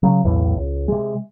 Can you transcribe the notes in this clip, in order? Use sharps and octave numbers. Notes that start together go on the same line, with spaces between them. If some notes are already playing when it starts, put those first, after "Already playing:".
C#3 F#3
B1 E2 A2
C#2
C3 G#3